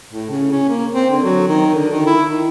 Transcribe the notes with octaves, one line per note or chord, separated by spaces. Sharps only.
A2
C#3
C#4
A#3
C4
D3
F#3
D#3
D3
D#3
E4
D#3